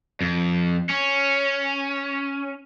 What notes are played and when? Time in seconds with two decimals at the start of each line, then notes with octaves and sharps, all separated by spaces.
0.21 F2
0.90 C#4